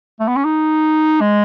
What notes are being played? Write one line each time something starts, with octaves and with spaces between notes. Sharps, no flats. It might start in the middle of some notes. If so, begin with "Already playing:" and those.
A3
B3
C#4
D#4
G#3